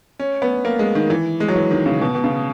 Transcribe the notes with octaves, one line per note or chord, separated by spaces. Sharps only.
C#4
B3
A#3
G#3
D#3
E3
G#3
F#3
E3
D#3
C#3
B2
B2
C#3